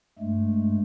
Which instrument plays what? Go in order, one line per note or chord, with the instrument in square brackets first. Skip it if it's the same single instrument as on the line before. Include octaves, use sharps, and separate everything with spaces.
[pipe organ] G2 G#3 A3